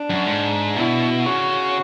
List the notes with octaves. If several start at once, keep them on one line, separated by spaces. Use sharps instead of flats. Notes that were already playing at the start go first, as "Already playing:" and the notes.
Already playing: D4
F#2
G#2
B2 E4
C#3 F#4